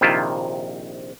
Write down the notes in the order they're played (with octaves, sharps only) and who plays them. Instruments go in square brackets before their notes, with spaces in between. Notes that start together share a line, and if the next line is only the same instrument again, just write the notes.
[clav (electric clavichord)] A#1 C3 D#3 E4 F4 A5